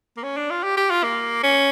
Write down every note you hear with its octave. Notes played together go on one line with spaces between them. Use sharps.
A#3
C#4
D4
F4
G4
G4
F4
A#3
C#4